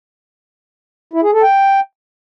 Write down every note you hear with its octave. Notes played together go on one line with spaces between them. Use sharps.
E4
G#4
A4
G5